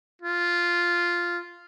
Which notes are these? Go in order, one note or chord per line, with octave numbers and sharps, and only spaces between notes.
F4